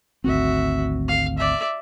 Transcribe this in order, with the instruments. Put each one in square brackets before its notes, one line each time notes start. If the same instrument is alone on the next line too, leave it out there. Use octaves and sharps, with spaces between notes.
[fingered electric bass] G#1 D2 C4 [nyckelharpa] F#4 E5
[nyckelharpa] F5
D5 E5